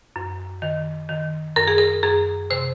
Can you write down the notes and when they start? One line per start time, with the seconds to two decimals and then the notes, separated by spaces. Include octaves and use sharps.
0.16 F#2
0.62 D#3
1.09 D#3
1.56 F#2 A#4
1.68 G#4
1.78 A#4
2.03 F#2 G#4
2.50 C3 C5